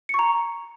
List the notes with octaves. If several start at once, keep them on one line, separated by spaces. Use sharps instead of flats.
A#5 C#6 C#7